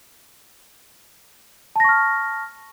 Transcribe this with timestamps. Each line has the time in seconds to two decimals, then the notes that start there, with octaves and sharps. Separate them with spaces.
1.76 A5
1.80 A#6
1.84 C#6
1.89 F6